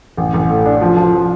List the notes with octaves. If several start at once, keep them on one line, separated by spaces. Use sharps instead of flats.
A1
A1
A2
D4
F3
F3
F3